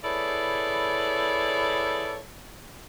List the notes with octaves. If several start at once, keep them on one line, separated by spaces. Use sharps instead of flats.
E4 G#4 A4 B4 C#5 D5